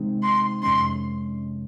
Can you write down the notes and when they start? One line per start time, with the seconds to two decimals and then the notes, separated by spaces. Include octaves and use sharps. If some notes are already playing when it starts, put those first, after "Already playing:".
Already playing: C3 D#3 G#3 C4 D#4
0.23 C6
0.62 F2 C3 D#3 G#3 C#4 C6